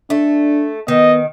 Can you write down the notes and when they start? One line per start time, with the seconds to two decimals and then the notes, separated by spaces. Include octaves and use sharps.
0.10 A3 D4
0.88 D#3 B3 D#5